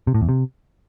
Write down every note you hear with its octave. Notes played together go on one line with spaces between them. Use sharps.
C3
A2
E2
C3